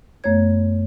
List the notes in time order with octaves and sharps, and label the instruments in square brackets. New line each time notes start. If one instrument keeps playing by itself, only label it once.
[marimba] F#2 A3 B3 C#5 G#6